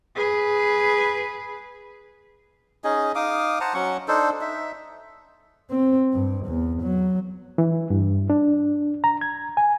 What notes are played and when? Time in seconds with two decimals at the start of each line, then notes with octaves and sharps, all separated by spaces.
0.16 G#4 B4
2.84 C#4 D#4 G#4 D#5
3.15 D#4 F5 D6 D#6
3.61 C5 F#5 A5 A#5
3.74 F#3 C#4 F#5 C#6
4.08 D4 D#4 A4 C5
4.41 D#4 E5
5.70 C4
6.13 G2
6.46 E2
6.82 F#3
7.58 E3
7.90 G2
8.30 D4
9.04 A#5
9.21 G#6
9.57 G#5